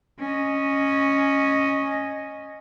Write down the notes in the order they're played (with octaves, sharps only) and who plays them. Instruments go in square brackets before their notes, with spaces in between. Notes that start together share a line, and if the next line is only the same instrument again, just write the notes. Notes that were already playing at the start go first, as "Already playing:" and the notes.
[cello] C#4 D#5